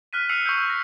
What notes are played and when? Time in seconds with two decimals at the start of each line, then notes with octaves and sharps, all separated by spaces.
0.13 F6 F#6 B6 D#7
0.29 E6 C7 C#7 D#7 F7 F#7
0.46 C#6 E6 G6
0.58 E6 F#7
0.70 A#6 C7